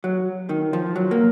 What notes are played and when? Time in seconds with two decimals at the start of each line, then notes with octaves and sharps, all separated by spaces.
0.04 F#3
0.49 D#3
0.73 F3
0.96 F#3
1.11 A#3